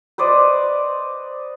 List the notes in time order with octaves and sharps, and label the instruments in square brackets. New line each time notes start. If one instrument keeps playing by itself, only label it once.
[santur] B4 C5 D5 D#5